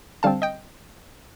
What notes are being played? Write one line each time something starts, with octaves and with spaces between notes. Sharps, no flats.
D3 G3 C4 F5 A5
D#5 G5